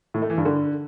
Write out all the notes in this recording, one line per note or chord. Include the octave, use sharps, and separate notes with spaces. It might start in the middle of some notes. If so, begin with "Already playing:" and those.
A2
A3
E3
G2
D3